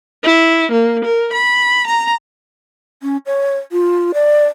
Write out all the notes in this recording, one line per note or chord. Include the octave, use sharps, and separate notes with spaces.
E4
A#3
A#4
B5
A#5
C#4
C#5
F4
D5